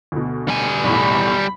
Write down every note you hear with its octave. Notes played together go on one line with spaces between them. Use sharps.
D2 B2
G3 G#5
B1 E2 A2 B5